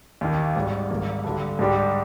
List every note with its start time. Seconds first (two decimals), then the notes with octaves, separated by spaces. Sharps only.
0.21 D#2 D#3 A#3
0.55 G#1 G#2 G3
0.91 G#1 G#2 G3 A#3
1.25 G2 D3 G3
1.59 G#2 G3 D4 G4